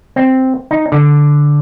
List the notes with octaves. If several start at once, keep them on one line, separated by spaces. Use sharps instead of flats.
C4
D#4
D3